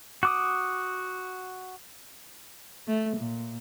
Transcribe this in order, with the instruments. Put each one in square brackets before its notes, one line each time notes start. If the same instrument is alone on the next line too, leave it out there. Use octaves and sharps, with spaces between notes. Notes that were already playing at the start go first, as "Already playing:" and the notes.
[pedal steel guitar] F#4 D6 D#6
[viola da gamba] A3
A#2